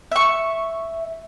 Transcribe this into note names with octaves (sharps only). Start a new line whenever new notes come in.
E5 C#6